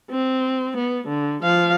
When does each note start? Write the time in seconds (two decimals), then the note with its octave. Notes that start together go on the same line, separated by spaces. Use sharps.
0.11 C4
0.77 B3
1.08 D3
1.43 F3 F5